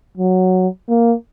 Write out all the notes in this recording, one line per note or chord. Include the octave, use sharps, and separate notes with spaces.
F#3
A#3